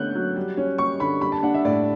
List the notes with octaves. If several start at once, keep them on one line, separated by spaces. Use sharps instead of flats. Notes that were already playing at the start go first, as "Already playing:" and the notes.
Already playing: D3 A3 B3 C#4 F#6 G6
F#3
G3
C#4
G3 C#6
D3 B5
G3 B5
A5
D4 F#5
E5
A2 D5